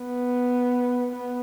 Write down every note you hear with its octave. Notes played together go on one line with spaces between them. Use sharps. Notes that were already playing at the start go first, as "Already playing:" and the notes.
Already playing: B3
B3